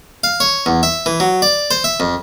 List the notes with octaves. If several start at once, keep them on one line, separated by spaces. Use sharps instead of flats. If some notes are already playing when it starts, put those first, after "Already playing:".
F5
C#5
E2
E5
E3
F#3
D5
C5
E5
F2